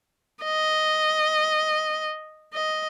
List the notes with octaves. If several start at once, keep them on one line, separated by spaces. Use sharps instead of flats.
D#5
D#5